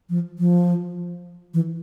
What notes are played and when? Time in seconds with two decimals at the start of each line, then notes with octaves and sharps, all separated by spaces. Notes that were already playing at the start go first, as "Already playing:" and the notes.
0.10 F3
0.39 F3
1.54 E3